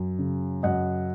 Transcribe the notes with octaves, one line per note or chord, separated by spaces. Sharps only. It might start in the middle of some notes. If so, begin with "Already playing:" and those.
Already playing: F#2
C#3
F#2 D#5 F#5